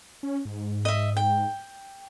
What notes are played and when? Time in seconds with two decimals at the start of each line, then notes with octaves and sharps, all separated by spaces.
0.23 C#4
0.45 G#2
0.85 D#5 E5
1.17 G5